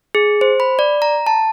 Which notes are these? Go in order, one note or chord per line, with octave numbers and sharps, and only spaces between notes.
G#4
C5
B5
D5
A#5
A5